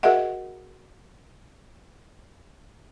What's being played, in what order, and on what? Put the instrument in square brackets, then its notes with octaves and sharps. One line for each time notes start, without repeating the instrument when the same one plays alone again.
[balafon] F#4 G#4 A#4 D#5 E5 F#5